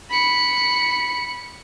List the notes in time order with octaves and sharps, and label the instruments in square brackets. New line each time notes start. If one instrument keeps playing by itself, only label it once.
[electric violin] B5 C#7